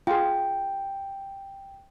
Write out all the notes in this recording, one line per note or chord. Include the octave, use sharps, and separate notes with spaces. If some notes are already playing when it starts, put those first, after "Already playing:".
F4 G#4 G5